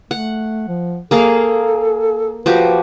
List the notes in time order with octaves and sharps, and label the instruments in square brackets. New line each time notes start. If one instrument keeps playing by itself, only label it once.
[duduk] A3 [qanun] F#5
[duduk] F3
[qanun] A#3 G#4 F5 [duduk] A4
[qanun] F3 F#4 G4 [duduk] B4